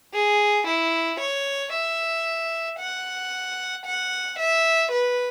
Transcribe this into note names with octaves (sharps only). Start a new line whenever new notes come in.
G#4
E4
C#5
E5
F#5
F#5
E5
B4